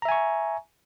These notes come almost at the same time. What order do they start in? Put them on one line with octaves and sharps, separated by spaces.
A#5 E5 G#5 C#6